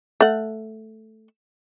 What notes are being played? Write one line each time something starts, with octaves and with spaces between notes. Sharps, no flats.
A3 F#5